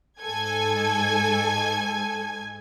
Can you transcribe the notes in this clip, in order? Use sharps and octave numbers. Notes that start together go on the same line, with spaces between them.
G#2 A4 G#5 G#6